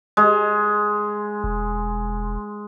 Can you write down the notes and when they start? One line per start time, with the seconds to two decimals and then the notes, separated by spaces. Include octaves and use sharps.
0.17 G#3
1.44 E1